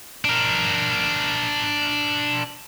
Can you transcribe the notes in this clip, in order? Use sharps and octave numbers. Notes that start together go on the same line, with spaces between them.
D4 A#4